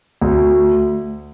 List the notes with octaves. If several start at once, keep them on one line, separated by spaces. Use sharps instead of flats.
D2